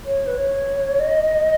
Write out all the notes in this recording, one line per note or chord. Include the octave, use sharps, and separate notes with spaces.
C#5
B4
C#5
D#5